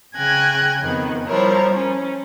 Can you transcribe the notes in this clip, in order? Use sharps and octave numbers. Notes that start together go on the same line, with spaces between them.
C#3 G5 G#5 F#6 G#6 A#6
F2 D#3 B3
F3 G3 E4 A#4 C#5
C#4